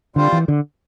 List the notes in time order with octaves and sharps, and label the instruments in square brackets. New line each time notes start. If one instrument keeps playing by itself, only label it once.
[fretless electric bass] D3 [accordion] G3 C4 F4 C5
[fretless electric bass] E3
D3